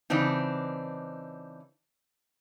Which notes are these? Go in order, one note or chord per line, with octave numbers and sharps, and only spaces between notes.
C#3 E3 C4 D4 D#4